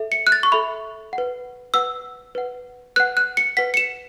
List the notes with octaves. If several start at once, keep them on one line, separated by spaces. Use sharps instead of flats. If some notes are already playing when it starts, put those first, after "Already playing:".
Already playing: A4 E5
C#7
F#6
A6
C#6
A4 E5 B5
F#5
B4
B4 F#5 E6
B4 F#5
B4 F#5 F#6
F#6
C#7
B4 F#5 B6
C#7
E7